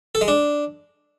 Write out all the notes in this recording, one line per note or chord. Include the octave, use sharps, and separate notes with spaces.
A4
G#3
D4